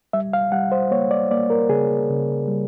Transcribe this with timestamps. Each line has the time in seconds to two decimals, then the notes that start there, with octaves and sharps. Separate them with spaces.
0.13 G3 E5
0.33 F5
0.52 G3 F#5
0.72 C5
0.91 A#3 C#5
1.11 D5
1.31 A#3 D5
1.50 A#4
1.69 C#3 G#4
2.10 C#3
2.48 G3